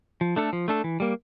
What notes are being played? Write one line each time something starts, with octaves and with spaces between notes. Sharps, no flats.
F3
A3 D4 A4
F3
A3 D4 A4
E3
G3 A#3